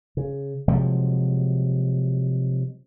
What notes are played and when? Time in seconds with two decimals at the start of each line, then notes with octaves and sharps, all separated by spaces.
0.17 C#3
0.68 C3 F3 F#3 G#3